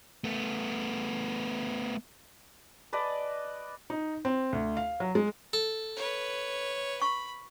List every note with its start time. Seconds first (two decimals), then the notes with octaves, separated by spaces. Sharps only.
0.24 A3 B3
2.93 B4 D5 D#5 A5
3.90 D#4
4.25 C4
4.53 D2
4.77 F5
5.00 F#3
5.15 G#3
5.53 A4
5.96 B4 C#5
7.02 B5 C#6